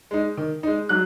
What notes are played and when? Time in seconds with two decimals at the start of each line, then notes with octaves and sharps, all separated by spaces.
0.11 G#3 D#4
0.37 D#3
0.63 G#3 D#4
0.89 F#3 F#6